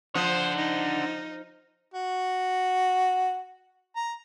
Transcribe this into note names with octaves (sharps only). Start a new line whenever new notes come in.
F3 D4 C5 F#5
D#4
F#4
A#5